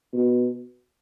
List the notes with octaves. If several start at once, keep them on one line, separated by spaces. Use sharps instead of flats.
B2